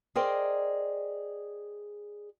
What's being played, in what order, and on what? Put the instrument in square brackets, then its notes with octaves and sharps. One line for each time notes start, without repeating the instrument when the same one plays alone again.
[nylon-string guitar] G#4 A#4 C5 D5 D#5 G5